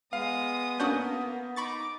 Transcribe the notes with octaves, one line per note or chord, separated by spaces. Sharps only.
G#3 B3 F5 D#6
A#3 C#4 D4 F#4 D#6 G6
D#4 B5 C#6 D6 A6